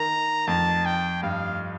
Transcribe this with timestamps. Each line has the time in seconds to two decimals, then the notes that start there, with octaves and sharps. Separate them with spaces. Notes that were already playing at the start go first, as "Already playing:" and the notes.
Already playing: D#3 A#5
0.47 F2 A5
0.86 G5
1.23 G2 F5